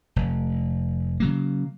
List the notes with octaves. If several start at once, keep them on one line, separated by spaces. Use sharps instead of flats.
F1
C#3 F#3 A#3